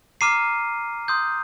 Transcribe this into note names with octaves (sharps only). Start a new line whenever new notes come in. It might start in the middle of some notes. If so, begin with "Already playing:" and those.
A#5 D6 F6 C7 D#7
C6 D#6 G6